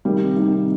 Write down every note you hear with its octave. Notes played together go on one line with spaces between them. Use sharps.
C3 D#3 G3 A#3
C3 D#3 G3 A#3